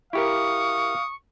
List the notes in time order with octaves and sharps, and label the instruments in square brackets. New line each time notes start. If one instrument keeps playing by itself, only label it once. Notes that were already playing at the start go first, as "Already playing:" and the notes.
[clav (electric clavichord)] E4 G4 A#4 [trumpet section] F#4 F5 D#6 [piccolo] C#6